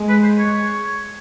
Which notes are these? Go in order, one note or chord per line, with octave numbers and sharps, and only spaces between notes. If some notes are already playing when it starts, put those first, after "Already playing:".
Already playing: G#3
B4
C5
C#5